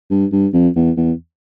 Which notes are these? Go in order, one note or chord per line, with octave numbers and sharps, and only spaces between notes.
G2
G2
F2
E2
E2